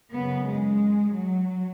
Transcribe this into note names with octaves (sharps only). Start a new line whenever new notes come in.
F#2 C#3 B3
G#3
F#3